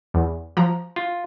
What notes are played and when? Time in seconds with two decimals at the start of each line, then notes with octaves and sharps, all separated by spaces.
0.14 E2
0.57 F3 A#5
0.96 F4